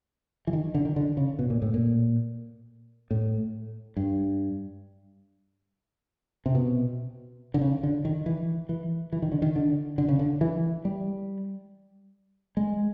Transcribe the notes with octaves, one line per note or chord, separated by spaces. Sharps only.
E3
D#3
D3
D#3
D3
C#3
B2
A#2
A2
A#2
A2
G2
C3
B2
D3
C#3
D3
D#3
E3
E3
E3
D#3
D3
D#3
D3
D3
C#3
D3
E3
G3
G#3